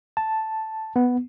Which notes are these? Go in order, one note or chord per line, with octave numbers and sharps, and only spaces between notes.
A5
B3